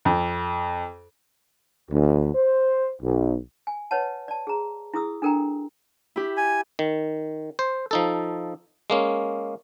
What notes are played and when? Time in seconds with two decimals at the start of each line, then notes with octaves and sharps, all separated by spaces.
0.05 F2
1.90 D2
2.34 C5
3.02 B1
3.67 G#5
3.91 B4 C#5 D#5 F#5 A5
4.28 D5 A5
4.47 G#4 A#5
4.94 E4 G#4 D#6 E6
5.22 D4 A4 A#4 G5 A#5
6.16 E4 G4
6.37 G#5
6.79 D#3
7.59 C5
7.91 F3 D#4 A4
8.90 G#3 A#3 C#4